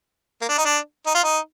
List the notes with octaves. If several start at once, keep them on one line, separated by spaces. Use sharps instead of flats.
A#3
D4
D#4
D4
D#4
F4
D#4